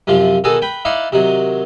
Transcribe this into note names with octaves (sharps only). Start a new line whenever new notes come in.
F#2 C3 F3 F4
B2 D#3 F#4 G#4 A4
B4 G5
D#4 E4 D5 F5 F#5
C3 D#3 F#3